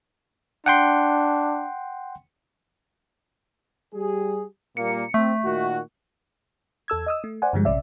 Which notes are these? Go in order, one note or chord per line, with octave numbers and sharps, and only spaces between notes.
D4 F#5 G5 C6
G3 G4 G#4
A#2 G3 A#3 C#7
A3 C4
A#2 D#3 F#4
E2 A4 E6 G#6
D#5 D#6 E6
A3
C5 D5 F#5 G#5
G2 D3 F3 G3 G#3
A#1 C3 C#4 D5 E5